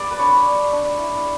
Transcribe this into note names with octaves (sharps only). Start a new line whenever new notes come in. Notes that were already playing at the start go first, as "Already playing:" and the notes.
Already playing: G3 B3 D5
B4
D4 C#5
D4
D4
E4